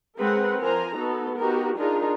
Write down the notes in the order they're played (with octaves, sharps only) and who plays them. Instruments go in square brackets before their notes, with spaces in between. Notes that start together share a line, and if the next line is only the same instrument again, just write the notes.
[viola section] G#3 C4 A#4 B4 F#5
F3 A#4 C5 G#5 A#5
B3 D#4 F#4 A4
B3 D#4 F#4 G4 A#4
D4 D#4 F4 G#4 A#4